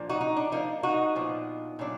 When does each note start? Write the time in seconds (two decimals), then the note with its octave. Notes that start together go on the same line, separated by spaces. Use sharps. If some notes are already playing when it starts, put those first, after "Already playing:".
Already playing: A#2 F3 A#3 D4
0.09 D#4 F#4
0.21 D#4
0.37 D4
0.52 F3 A#3 D4 D#4
0.83 D#4 F#4
1.15 A#2 F3 B3 D4
1.79 A#2 F#3 D4